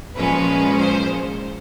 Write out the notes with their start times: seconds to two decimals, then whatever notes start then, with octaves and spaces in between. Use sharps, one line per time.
0.15 A#2 F3 G#3 C#4 B4
0.78 C5